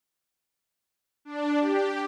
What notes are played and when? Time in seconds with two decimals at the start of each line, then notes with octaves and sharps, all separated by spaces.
1.25 D4
1.60 G4